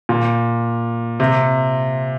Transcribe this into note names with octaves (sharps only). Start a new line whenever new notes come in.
A#2
C3